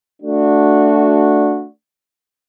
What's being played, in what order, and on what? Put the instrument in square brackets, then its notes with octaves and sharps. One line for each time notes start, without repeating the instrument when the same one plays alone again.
[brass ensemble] A3 D4 F#4